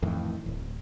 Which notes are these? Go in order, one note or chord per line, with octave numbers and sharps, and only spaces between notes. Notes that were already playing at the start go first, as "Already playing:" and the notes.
F2 A2 D#3 E3
D1